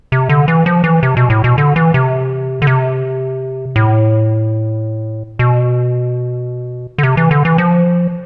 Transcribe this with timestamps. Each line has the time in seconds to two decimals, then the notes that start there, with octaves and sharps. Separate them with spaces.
0.12 C3
0.29 D3
0.48 E3
0.66 F3
0.84 E3
1.03 C3
1.17 B2
1.30 A2
1.44 B2
1.58 D3
1.76 E3
1.94 C3
2.62 D3
2.67 C3
3.76 A2
5.39 B2
6.98 D3
7.03 C3
7.17 E3
7.31 D3
7.45 E3
7.58 F3